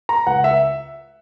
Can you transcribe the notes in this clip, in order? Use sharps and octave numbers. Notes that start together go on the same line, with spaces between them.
A#5
C#2 F#5
E5